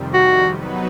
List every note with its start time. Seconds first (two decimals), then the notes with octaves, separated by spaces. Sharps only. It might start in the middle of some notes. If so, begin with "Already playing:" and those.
Already playing: F2 C3 D#3 G3
0.14 F#4
0.53 F#3 B3 D#4 F#4 B4